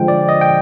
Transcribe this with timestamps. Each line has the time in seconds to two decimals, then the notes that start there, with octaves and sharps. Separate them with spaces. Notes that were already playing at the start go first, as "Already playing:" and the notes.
Already playing: D3 F3 G#3 G5
0.08 D5
0.29 D#5
0.41 G5